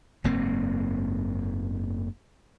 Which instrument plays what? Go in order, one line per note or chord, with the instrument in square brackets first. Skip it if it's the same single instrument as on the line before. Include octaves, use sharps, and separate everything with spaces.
[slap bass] F#1 G#2 A#3 C4